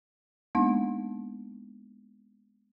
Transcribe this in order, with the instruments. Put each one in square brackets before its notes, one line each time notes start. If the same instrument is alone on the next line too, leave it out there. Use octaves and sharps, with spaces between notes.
[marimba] G#3 A#3 B3 D4 D#4